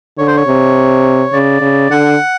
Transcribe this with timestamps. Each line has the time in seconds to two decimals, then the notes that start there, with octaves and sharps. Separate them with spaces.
0.18 D3 C#5
0.27 C5
0.37 C#5
0.47 C3
1.33 C#3 D5
1.61 C#3
1.90 D3 F#5